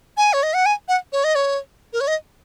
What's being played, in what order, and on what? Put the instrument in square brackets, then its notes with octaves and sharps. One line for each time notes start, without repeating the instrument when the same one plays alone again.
[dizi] G#5
C#5
D#5
F#5
G#5
F#5
C#5
D#5
C#5
A#4
C#5
D#5